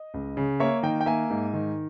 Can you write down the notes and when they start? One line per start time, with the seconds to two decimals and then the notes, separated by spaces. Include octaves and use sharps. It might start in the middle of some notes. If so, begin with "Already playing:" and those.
Already playing: D#5
0.14 C#2
0.37 C#3
0.60 A#3 C#5 E5
0.83 D#3 D#5 G5
1.01 G5
1.06 A#3 E5 G#5
1.30 G#2
1.54 D#3